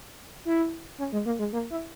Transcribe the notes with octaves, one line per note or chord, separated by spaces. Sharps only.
E4
C#4
G#3
A#3
G#3
A#3
E4